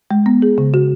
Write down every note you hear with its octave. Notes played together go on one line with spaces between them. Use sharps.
G#3
B3
G#4
C#3
F#4